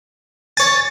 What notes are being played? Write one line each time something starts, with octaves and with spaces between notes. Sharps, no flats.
C#5 G#5 A6